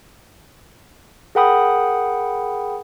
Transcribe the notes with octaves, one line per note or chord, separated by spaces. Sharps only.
G#4 A#4 F#5 G5 B5 D#6